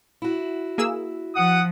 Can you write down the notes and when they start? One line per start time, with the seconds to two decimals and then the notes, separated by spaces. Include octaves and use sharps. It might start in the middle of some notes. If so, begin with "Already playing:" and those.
0.22 E4 F#4
0.78 A#3 G#4 E6
1.35 F3 F#5 D#6